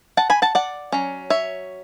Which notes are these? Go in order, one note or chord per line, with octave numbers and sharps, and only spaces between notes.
F#5 A5
G#5 B5
F#5 A5
D5 F#5
F#3 C#4
C#5 E5